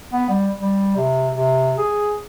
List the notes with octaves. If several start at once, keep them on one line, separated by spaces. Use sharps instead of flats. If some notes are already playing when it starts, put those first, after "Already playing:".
B3
G3
G3
C3
C3
G#4